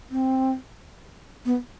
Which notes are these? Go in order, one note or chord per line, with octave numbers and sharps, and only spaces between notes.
C4
B3